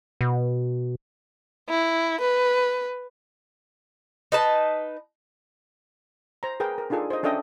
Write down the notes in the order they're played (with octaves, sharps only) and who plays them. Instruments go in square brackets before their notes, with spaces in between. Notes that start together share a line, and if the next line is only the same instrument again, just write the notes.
[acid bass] B2
[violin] E4
B4
[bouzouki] D#4 B4 A5
[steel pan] C5 A#5
G#4 A#4 B4 G5
A#4
D4 D#4 F4 G#4 A4 D5
C5 D#5
C#4 D4 A4 D#5 E5 G5